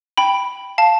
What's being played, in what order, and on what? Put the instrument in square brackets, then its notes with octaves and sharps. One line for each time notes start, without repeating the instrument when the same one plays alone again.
[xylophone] G5 B5
F5 A5